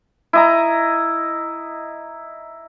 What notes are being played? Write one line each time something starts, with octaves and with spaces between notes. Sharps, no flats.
E4 D#5 A#5